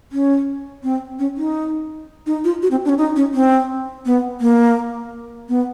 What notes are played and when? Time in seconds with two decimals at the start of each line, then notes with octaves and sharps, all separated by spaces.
0.12 C#4
0.83 C4
1.19 C#4
1.37 D#4
2.26 D#4
2.44 F4
2.62 F#4
2.71 C4
2.85 D4
2.89 C#4
2.98 D#4
3.16 C#4
3.34 C4
4.06 B3
4.41 A#3
5.49 B3